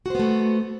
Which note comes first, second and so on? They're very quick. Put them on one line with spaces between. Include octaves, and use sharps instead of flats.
F#4 C5 B3 A3